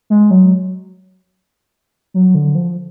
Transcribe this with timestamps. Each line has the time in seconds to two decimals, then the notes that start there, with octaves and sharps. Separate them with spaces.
0.10 G#3
0.31 F#3
2.14 F#3
2.35 D3
2.55 F3